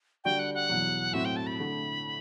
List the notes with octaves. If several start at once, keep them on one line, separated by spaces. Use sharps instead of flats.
D3 G3 D4 F#4 G5
F#5
F#5
E2 B2 F#3
A2 F#3 C4 F#4 E5
G5
A5
B5
D3 A3